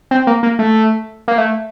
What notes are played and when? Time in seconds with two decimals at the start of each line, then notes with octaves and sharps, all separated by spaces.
0.11 C4
0.27 A#3
0.43 A#3
0.59 A3
1.28 A#3
1.38 A3